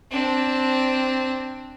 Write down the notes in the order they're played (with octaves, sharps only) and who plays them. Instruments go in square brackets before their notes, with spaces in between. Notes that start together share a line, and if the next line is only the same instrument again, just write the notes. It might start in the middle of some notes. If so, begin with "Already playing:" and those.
[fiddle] C4 D4